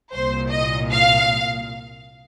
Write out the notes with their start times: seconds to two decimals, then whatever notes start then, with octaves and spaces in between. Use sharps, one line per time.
0.13 C2 A#2 C5
0.51 D#5
0.90 F5